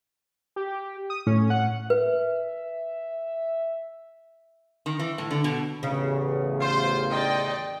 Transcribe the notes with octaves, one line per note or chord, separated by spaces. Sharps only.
G4
D#6
A2 C#4
F#5
B4 E5
D#3
E3
A2
D3
B2
A1 E2 C#3
F4 C5
D#3 C5 D5 D#5 G5